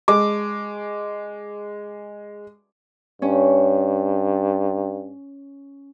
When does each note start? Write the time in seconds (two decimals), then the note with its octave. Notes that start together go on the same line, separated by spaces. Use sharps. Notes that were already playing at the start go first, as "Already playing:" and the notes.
0.08 G#3 D6
3.22 G2 C#4